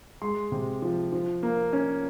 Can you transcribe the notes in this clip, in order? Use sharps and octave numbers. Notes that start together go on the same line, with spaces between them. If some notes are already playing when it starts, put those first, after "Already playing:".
G#3 C6
C3
F3
F3
A#3
C#4